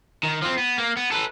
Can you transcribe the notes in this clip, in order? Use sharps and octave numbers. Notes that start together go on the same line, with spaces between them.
D#3
F3 C4
B3
A#3
B3
A4 B4